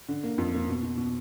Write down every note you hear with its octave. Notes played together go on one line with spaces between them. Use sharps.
D3
A#3
F2
A#3
B2
B2
B2